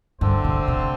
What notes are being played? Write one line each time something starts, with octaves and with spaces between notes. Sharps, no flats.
G2 D3 A3 C4 A4 C5
C3
C3